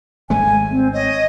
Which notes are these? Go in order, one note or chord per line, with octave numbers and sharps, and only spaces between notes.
G#1 G#3 A3 G#5
C4
C#5 D#5